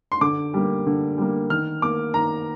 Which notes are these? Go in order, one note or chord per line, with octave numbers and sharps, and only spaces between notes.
C6
D3 D6
G3 A#3
D3
G3 A#3
D#3 F6
A#3 D6
D#3 A#5